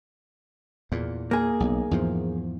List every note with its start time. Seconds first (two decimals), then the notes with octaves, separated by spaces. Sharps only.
0.92 E2 A#2
1.31 A#3 G#4
1.60 B1
1.91 E2 G#2 F3